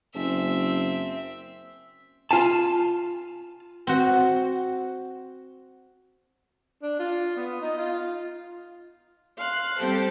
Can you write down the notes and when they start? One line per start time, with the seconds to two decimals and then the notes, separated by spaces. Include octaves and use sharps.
0.15 F#1 C4 E5
2.31 F4 G#5 A5
3.87 C4 F#4
6.82 D4
6.99 F4
7.36 B3
7.61 D#4
7.78 F4
9.36 F5 C6 F#6
9.78 G3 C4 G4 A4 C5